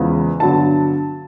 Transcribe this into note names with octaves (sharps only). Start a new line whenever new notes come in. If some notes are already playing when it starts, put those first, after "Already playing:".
Already playing: E2 C#3 F3 G#3 B3
G2 D3 F#3 B3 A5